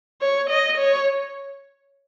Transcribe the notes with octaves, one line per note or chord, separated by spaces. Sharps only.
C#5
D#5
C#5